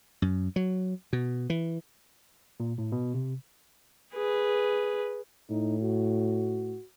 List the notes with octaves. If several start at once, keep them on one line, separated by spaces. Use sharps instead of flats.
F#2
F#3
B2
E3
A#2
A2
B2
C3
G#4 B4
A2 D#4
F#4